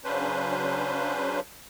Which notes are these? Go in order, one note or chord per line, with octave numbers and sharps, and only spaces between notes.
C#3 F#3 C#4 D4 B4 C5